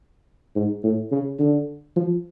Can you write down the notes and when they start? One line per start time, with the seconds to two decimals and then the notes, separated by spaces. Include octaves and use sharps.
0.55 G#2
0.83 A2
1.12 C#3
1.39 D3
1.96 F3